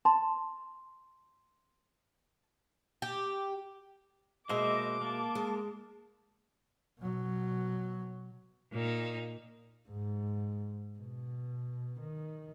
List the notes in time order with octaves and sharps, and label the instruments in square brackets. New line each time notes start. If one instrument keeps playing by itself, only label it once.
[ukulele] A5 [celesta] C6
[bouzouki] G4
[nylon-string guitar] B2 G#3 [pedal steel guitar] A#3 C5 E5 [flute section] D#5 [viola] D6
[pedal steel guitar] A#3 [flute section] A5
[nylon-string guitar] G#3
[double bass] B2 F#3
[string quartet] A#2 D#4
[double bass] G#2
B2
D#3